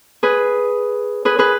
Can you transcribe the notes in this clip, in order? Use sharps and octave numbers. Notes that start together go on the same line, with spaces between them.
G#4 B4
G#4 B4
G#4 B4